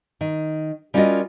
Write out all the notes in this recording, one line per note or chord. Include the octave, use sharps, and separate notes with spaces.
D#3
G3 C#4 F4 F#4 A#4 D#5